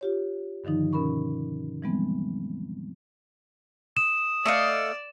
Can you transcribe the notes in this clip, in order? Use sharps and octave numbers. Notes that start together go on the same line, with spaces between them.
F4 G4 C#5
G2 D3 D#3 F3 D#4
B2 C#4 A#4 B5 C#6
E3 F3 G3 G#3 B3 C4
D#6 E7
A3 D5 D#5 F5